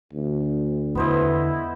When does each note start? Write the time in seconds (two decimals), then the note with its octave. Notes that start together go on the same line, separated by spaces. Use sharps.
0.13 D2
0.95 E2 D3 B3 E4 C5 D#5